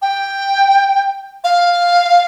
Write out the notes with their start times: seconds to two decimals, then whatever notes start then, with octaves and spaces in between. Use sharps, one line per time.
0.02 G5
1.44 F5